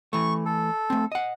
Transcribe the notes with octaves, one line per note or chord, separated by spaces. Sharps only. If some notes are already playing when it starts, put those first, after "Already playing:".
E3 A3 C#6
A4
A3 C4
D#5 F#5